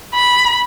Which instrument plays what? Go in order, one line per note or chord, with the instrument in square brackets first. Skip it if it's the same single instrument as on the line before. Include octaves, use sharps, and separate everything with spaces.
[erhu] B5